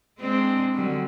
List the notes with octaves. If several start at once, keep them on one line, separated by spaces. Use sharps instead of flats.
G#3 C4 D4
D3 F#3 G3